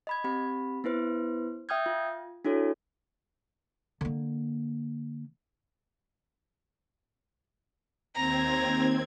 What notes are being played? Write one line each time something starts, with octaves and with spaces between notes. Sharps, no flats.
D#5 B5 G#6
C4 G4 B5
B3 E4 B4 C5
E5 G5 D#6 F6 G6 G#6
F4
D4 E4 F#4 A4 C#5
D3 A#3
D#2 C4 A#5 G#6